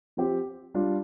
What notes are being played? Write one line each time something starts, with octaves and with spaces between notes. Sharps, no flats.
F3 C4 G4
G3 D4 F4